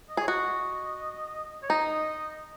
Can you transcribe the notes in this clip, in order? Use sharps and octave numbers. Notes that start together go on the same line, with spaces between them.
D#5
G#4 C#5
F#4 D#5
C#5
D#4 D#5